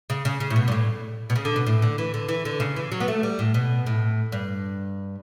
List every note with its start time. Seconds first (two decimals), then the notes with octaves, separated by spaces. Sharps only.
0.10 C#3
0.25 C#3
0.40 C#3
0.50 A2
0.56 B2
0.68 G2
0.72 A2
1.30 B2
1.36 C#3
1.45 D3
1.56 B2
1.67 A2
1.82 D3
1.98 E3
2.14 D3
2.29 E3
2.45 D3
2.60 C#3
2.76 E3
2.92 F#3
3.00 B3
3.08 A3
3.23 G3
3.39 A2
3.54 B2
3.86 A2
4.32 G2